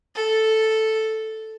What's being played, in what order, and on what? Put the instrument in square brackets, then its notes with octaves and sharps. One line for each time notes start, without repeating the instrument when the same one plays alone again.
[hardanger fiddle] A4